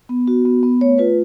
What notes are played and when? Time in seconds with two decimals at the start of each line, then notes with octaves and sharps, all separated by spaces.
0.09 B3
0.28 F#4
0.45 B3
0.63 B3
0.81 A3 C#5
0.98 F4 B4